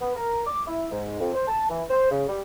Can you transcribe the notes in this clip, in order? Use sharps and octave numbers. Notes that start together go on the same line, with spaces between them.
B3
A#4
D6
E4
G#2
F2
C5
A5
E3
C5
C#3
G3